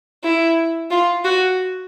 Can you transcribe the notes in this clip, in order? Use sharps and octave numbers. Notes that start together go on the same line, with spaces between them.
E4
F4
F#4